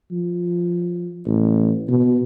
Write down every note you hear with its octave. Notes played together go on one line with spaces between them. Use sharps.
F3
A1
B2